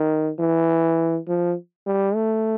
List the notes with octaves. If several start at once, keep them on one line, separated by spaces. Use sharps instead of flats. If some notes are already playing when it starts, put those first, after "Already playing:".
Already playing: D#3
E3
F3
G3
A3